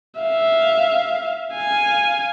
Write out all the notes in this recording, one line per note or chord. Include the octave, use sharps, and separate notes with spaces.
E5 F5
F5 G#5